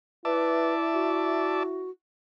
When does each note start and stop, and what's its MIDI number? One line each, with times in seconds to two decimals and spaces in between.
0.25 1.89 64
0.25 0.73 71
0.25 1.63 74
0.25 1.63 76
0.25 1.63 81
0.94 1.90 66